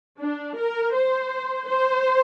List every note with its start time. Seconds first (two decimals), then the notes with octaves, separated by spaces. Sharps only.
0.19 D4
0.56 A#4
0.94 C5
1.67 C5